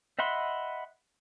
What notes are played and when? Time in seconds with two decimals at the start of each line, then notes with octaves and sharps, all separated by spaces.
0.19 D#5 E5 F#5 B5 C6